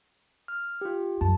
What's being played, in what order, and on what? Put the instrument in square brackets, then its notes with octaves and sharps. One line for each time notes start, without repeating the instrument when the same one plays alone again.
[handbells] F6
F4 G4
[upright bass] F#2 [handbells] A5